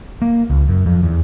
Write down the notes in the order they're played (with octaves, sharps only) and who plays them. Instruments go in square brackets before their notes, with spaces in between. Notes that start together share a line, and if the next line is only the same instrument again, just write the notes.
[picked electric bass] A#3
C#2
F#2
F2
E2